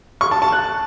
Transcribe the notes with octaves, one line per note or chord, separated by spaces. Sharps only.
C#6
A5
A5
F#6